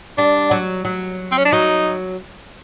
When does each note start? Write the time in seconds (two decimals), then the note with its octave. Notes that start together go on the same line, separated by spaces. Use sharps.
0.18 G3 D4
0.51 F#3
0.85 F#3
1.32 C4
1.38 C#4
1.45 D4
1.52 F#3 D#4